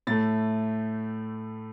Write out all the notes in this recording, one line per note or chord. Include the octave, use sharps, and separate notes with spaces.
A2 A3 A6